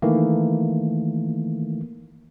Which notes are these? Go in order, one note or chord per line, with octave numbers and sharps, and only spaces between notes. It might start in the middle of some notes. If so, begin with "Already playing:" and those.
D#3 E3 A3 A#3